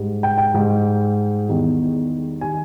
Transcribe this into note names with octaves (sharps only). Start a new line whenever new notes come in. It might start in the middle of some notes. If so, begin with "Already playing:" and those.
Already playing: G#2 G3
G5
G5
G#2 G3
E2 D#3 G3
D#3 G3 G#5